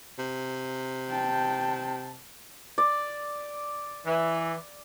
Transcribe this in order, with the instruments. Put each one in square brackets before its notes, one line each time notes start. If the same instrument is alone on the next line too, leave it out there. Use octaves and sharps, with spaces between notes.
[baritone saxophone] C3
[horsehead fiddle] G5 A5
[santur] D5
[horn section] E3